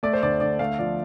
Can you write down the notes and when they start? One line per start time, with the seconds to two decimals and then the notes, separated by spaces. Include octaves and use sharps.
0.03 A3 D5
0.13 C5
0.22 D2 D5
0.40 D2 D5
0.59 A3 F5
0.79 F3 D5